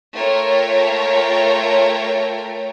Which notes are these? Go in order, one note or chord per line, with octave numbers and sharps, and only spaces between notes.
A3 F4 A#4 C#5 G5 A#5